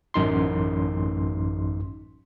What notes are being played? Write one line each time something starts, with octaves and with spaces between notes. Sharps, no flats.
A1 F#2 D#4 C6